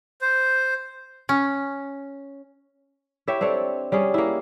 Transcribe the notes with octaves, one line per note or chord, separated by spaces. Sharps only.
C5
C#4
E4 G4 C#5 E5
C4 D4 A4 C#5
G3 C#4 G#4
A#3 E4